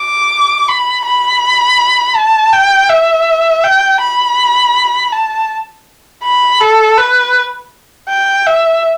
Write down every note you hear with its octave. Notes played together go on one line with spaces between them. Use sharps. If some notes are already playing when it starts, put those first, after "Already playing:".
Already playing: D6
B5
B5
A5
G5
E5
G5
B5
A5
B5
A4
B4
G5
E5